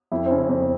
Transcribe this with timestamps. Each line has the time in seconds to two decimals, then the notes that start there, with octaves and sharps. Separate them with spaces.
0.12 F2 E4
0.26 C4
0.30 C#3 C#4
0.49 F2 C4